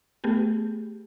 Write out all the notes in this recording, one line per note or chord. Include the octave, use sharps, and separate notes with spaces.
A3 B3 G4 G#4